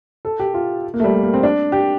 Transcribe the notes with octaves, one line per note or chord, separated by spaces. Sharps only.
A4
G4
F4
A#3
A3
G3
A3
A#3
C4
D4
G4